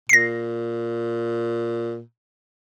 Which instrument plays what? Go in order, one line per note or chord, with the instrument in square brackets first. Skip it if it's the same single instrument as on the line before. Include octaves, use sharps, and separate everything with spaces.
[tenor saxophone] A#2 [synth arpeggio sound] A#6 C7